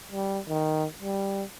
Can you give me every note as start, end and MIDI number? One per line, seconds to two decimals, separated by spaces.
0.12 0.40 55
0.49 0.86 51
1.02 1.44 55